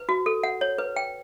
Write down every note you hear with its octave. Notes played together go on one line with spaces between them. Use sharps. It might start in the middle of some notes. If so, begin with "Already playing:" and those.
Already playing: B4
F#4
A4
F#5
C#5
B4
G5